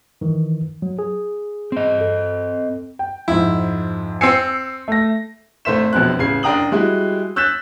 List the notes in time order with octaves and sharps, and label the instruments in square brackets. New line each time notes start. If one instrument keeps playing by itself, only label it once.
[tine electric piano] D#3 E3
F#3
G#4
[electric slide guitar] C4 D#5
[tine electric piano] A4
[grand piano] G5
[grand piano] F2 G#2 [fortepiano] E4
[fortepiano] C4 G#5 [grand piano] E6 C7 C#7
[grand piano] A3 A#6
[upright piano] G#1 A3 C5 E5 B6 E7
E1 A#1 F2 B2 C4 F#6
A1 C#3 G#6 C7
F#1 D4 G5 A#5 D#6 F#7
G3 G#3 E4 F#4
E6 F#6 G6 A6 B6 E7